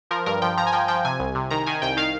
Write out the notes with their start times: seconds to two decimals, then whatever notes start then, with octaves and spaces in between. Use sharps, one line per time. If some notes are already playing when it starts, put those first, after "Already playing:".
0.11 F3 A#4
0.26 G2 A#4
0.42 F3 G5
0.57 F3 A#5
0.67 G#5
0.73 F3 G5
0.88 F3 G5
1.05 C3 G#5
1.20 C2
1.35 C3
1.51 D#3 A#5
1.67 D#3 G#5
1.82 C2 G5
1.97 D#3 F5